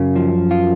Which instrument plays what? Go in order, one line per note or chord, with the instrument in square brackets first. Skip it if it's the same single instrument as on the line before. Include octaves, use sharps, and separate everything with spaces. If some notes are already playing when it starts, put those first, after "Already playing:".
Already playing: [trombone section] F#2 [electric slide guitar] C#3
[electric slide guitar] F3
F4